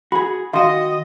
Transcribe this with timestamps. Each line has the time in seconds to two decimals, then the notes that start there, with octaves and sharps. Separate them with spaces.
0.12 F#4 G#4 B5
0.53 D#3 F#4 D#5 F5 C6